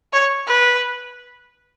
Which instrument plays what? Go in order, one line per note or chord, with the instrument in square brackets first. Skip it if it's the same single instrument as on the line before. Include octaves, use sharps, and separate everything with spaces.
[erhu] C#5
B4